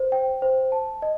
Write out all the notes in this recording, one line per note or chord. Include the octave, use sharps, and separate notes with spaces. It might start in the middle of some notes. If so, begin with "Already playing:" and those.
Already playing: C5
G5
C5
A5
D#5